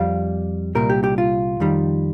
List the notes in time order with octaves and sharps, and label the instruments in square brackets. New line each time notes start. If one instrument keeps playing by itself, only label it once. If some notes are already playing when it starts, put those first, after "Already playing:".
Already playing: [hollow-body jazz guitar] F2 G3 F5
C2 A#2 G3 A#4
G4
G4
F4
F2 D#3 G3